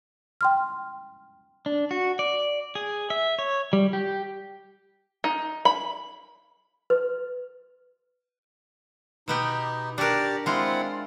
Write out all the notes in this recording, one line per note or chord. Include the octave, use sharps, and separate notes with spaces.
G5 C6 F6
D4
F#4
D5
G#4
E5
C#5
G3
G4
D#4
B5
B4
B2 B3 D#4 G4
D4 F#4 G4 A#4 D5
G#3 C4 E4 F4 F#5